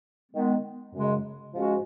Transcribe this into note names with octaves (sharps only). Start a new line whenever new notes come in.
D#3 G#3 B3
F#2 C#3 G#3
G#2 F3 G#3 C#4 F#4